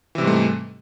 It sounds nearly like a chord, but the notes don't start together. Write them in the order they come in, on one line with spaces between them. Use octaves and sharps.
E3 C3 G3 G#2 A3